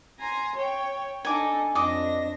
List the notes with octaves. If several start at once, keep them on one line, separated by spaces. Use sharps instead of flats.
G#5 A#5 C6
C#5 G5
D4 D#4 A4 G#5 D6
F2 D4 D#5 D6 A#6